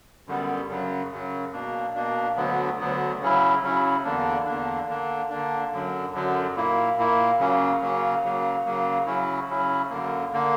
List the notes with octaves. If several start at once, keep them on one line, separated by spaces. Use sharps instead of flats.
F#2 D3 G3 B3
F#2 C#3 F#3
F#2 C#3 F#3
B2 A#3 D4
B2 A#3 D4
D2 D3 F#3 B3
D2 D3 F#3 B3
C#3 F#3 C#4 E4
C#3 F#3 C#4 E4
E2 D3 A#3 D4
E2 D3 A#3 D4
D3 A#3 D4
D3 A#3 D4
F#2 D3 F#3
F#2 D3 F#3
A#2 A#3 E4
A#2 A#3 E4
C#3 F#3 A#3 C#4
C#3 F#3 A#3 C#4
C#3 F#3 A#3
C#3 F#3 A#3
C#3 F#3 C#4 E4
C#3 F#3 C#4 E4
F#2 D3 A#3
D3 A#3